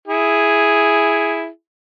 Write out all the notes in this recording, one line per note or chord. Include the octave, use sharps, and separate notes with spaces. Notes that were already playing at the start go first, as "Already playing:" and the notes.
E4 G#4